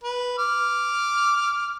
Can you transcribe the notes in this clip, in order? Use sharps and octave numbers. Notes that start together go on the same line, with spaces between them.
B4
D6 F6